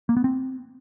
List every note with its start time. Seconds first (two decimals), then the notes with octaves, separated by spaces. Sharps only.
0.09 A#3
0.17 B3
0.24 C4